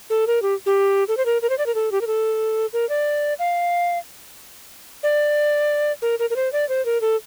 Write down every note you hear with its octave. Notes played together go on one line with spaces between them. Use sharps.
A4
A#4
G4
G4
A4
C5
A#4
A#4
C5
D5
A#4
A4
G4
A#4
A4
A#4
D5
F5
D5
A#4
A#4
A#4
C5
D5
C5
A#4
A4